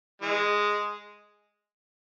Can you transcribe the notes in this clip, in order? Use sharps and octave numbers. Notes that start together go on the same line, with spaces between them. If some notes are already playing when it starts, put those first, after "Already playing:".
E3 G#3